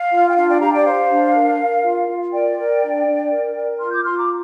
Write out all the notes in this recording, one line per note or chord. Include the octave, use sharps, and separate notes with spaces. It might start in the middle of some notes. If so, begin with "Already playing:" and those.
Already playing: F5
F4
G5
D4 F5
D5 G5
G4 F5 A#5
D5 G5
C5 F5
D4
A#4
A#4
F4
F4
A#4 D5 G5
A#4
D4
D4
A#4
A#4
F4 C6 F6
D6 G6
F4 C6 F6
A#5 D6